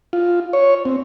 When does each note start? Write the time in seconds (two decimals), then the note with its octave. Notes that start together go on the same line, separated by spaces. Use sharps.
0.13 F4
0.53 C#5
0.85 C4